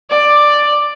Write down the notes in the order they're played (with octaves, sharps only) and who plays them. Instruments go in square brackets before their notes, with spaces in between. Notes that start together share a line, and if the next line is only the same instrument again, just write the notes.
[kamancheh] D5